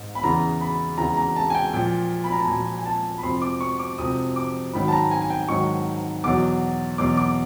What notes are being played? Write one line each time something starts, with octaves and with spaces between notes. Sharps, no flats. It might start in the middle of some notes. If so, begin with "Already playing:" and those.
Already playing: G#2
B5
E2 C#3 E3 A#5
B5
E2 C#3 E3 A#5
A#5
A5
G#5
G5
A#2 F3 G5
B5
A#5
A5
A#2 F3 G#5
G#5
A5
B5
F2 C3 F3 C6
D6
C#6
D6
F2 C3 F3 D#6
D6
G#2 D#3 F#3 B5
A5
A#5
G#5
G#5
G5
G#2 D#3 F#3 C#6
E2 B2 F#3 D6
E2 B2 F#3 D6
D6